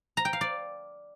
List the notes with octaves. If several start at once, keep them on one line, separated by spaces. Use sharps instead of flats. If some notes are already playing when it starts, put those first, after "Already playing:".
A#5
G5
F5
D5